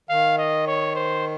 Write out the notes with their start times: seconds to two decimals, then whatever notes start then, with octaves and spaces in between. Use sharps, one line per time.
0.09 D#3 F5
0.38 D#5
0.67 C#5
0.95 C5